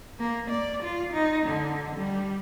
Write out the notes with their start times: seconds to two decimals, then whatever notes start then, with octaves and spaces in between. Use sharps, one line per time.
0.19 A#3
0.50 D5
0.83 F4
1.13 D#4
1.46 D3
1.96 G3